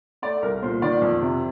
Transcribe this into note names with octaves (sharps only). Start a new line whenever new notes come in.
A3 D5
C2 A#4
A#2 C5
D#3 D5
F2
C3